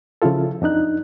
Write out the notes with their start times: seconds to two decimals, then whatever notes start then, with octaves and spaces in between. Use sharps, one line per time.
0.22 C#3 F3 E4 F4 A4
0.62 F2 D4 D#4 F#6